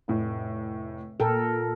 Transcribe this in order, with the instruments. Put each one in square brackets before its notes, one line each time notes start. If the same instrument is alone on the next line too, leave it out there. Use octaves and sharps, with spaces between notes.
[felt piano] F1 A2
[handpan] A#2 A4 A#4 [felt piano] G5